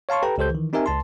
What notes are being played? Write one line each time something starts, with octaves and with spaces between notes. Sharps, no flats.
C#5 F5 A5 C6 C#6
G4 A4 B4 G5 A#5
C#2 G4 A4 C5 G6
D#3 E3
C4 D#4 G4 A#4 E5 G#5
C#2 A5 C6